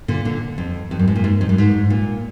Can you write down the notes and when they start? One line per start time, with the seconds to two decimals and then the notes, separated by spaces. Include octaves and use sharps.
0.08 A#2 D3
0.25 A#2 D3
0.58 F2
0.91 F2
0.99 F#2
1.08 G#2
1.16 A#2
1.24 G#2
1.41 F2
1.49 F#2
1.58 G#2
1.90 A#2